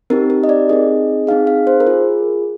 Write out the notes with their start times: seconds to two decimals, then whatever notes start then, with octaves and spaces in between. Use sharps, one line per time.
0.10 C4 D#4 G4 A#4
0.30 A#4
0.44 D#5
0.49 D5
0.69 C4 D#4 G#4 D#5
1.27 C4 D#4 G#4 F5
1.47 F5
1.67 C5
1.80 A#4
1.86 F4 G#4